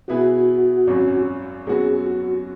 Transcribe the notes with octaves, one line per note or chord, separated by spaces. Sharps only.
B2 B3 E4 F#4 G#4 B4
G#1 F#2 F#3 C#4
F#2 F#3 B3 F#4 G#4
F#4